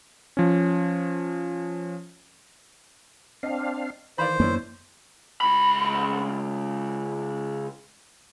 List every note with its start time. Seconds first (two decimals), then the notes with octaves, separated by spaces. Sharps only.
0.37 F3 C#4
3.43 C4 D4 D#5 F5
4.18 D#3 E3 C5 D5 F5 B5
4.40 F#2 A#3 B3 C#4 D4 E4
5.41 C#2 B5